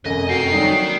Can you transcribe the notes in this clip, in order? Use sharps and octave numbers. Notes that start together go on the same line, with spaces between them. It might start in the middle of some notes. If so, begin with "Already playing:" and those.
F1 F#2 D#5 G#5
F#4 A#4 G5 C7
F#3 G3 A#3 D#4